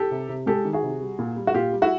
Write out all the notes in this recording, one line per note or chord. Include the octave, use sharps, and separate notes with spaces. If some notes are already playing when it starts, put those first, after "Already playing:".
Already playing: G4 A4
C3
C3
G#3 G4 A4
D#3
F#4 G#4
C3
G3
A#2
G3
F#4
A#2 F4 G4
G3
E4 F#4